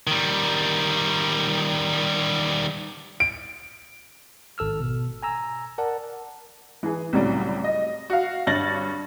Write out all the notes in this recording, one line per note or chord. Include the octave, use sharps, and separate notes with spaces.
D#3 G3
D7
G#1 A4 E6 F6
B2
G#5 A#5 E6
A#4 D5 F#5 A5
E3 G#4
C2 A2 C#3 F#3 G3
D#5
F#4 F5
G2 D4 C#5 A6 A#6 F#7